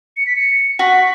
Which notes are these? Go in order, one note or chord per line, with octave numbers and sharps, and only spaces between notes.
C#7
B6
C#7
F#4 B6